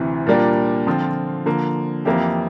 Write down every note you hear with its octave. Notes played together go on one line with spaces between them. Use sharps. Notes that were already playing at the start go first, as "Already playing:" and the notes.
Already playing: D2 C3 E3
A#2 G3 A#3 D4
D3 F3 C4 F4
D3 F3 A#3
F2 E3 A#3 E4 G4